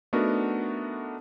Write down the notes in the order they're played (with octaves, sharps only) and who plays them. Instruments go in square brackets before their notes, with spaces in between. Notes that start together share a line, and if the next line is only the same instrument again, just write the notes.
[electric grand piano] A3 B3 D4 D#4 F#4 A#4